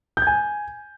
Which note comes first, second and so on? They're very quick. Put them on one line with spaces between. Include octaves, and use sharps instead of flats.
G6 G#6 G#5